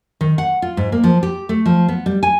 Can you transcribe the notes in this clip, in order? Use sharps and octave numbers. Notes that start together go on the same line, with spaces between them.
D#3
F#5
F4
G#2
A#3
F3
G4
A3
F3
B3
G3
G#5